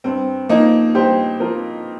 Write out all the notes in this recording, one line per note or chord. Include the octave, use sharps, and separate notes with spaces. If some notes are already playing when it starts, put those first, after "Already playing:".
G2 C4
F3 A#3 D#4
G2 G4 C5
F3 F4 A#4